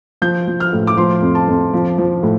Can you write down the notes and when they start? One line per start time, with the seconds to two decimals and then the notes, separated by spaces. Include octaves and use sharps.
0.22 F3 G6
0.48 F3
0.60 F6
0.73 A2
0.87 D6
0.97 F3 C6
1.22 F2
1.35 A5
1.48 F2
1.73 F3
1.98 F3
2.23 A2